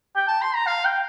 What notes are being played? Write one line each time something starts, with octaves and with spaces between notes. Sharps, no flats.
G5
A5
C6
A#5
F5
G5